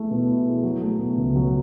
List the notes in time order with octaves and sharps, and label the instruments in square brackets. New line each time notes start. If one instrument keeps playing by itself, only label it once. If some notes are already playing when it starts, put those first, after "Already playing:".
Already playing: [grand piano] A3 E4 G#4
B2
E4
G#4
F#3
A3
B2
C#2
F#3